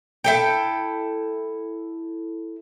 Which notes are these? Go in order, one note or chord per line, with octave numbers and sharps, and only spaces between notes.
E4 A4 G5